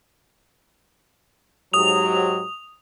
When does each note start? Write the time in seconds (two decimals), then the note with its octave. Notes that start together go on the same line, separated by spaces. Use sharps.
1.73 G#2 F#3 G4 D#6 F7